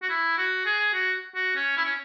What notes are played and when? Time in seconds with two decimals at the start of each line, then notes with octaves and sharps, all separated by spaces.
0.02 F#4
0.09 E4
0.38 F#4
0.66 G#4
0.94 F#4
1.35 F#4
1.56 C#4
1.77 E4
1.85 C#4